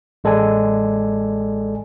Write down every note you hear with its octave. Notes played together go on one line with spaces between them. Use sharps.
A1 G#3 A4 D5 G#5